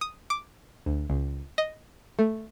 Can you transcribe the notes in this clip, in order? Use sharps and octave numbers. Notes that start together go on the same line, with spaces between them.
D#6
D6
D2
C#2
D#5
A3